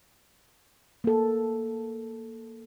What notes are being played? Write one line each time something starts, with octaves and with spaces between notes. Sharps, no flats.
A#3 A4